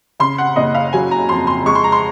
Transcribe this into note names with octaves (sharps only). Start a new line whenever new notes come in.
C#3 C6
F#5
F#1 D#5
F5
F#3 G#5
A#5
F2 C6
C6
G#3 C#6
C6
A#5
C6